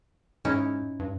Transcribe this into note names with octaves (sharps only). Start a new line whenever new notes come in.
G#2 C#4 D#4 E4
G2